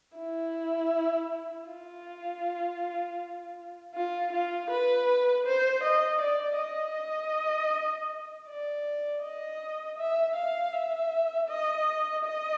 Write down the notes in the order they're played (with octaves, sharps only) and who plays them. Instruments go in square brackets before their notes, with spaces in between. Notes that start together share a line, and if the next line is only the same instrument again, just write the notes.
[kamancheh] E4
F4
F4
F4
B4
C5
D#5
D5
D#5
D5
D#5
E5
F5
E5
D#5
D#5